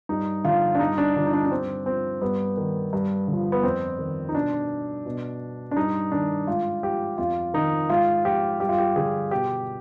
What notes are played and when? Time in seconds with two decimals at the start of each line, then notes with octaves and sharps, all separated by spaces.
0.09 G2 D#4
0.44 D3 F3 F4
0.75 D4
0.79 G2 D#4
0.98 D4
1.15 D3 F3 D#4
1.26 D#4
1.33 D4
1.46 D4
1.51 G2 C4
1.86 F3 C4
2.22 G2 B3
2.57 D#3
2.93 G2
3.28 D3
3.33 F3
3.52 B3
3.63 F2 C4
3.99 D#3
4.29 D#4
4.35 B2 D4
5.06 B2
5.71 D4
5.77 G2 D#4
6.12 D#3 D4
6.47 G#2 F4
6.83 F3 G4
7.18 F2 F4
7.54 D#3 D#4
7.90 G#2 F4
8.25 F3 G4
8.60 G2 G4
8.69 F4
8.78 G4
8.96 D3 F3 G#4
9.31 B2 G4